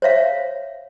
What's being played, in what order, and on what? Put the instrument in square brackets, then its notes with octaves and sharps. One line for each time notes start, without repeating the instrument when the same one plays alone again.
[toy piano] C5 C#5 E5 F5